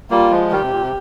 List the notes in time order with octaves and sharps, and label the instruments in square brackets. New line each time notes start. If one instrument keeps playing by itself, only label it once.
[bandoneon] G3 A#3 [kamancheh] F4
[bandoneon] F3 G#3
[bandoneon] D#3 G3 [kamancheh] G4
[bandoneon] C3
A#2
C3